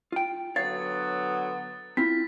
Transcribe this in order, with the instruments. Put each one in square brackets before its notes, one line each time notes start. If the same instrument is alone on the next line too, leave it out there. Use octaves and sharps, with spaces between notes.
[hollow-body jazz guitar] F4 G5
[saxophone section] D3 F#3 B3 [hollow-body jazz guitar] C#5 F5 [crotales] A6
[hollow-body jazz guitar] C4 E4 F4 [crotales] B6